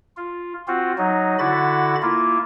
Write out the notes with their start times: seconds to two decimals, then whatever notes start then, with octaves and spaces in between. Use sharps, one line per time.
0.17 F4
0.68 C4 F4 F#4
0.98 F#3 D#4
1.39 D3 E4 F#4 B5 A6
2.02 A#3 E4 F4